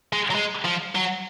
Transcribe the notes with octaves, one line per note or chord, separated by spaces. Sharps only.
G#3
F#3
G#3
F3
F#3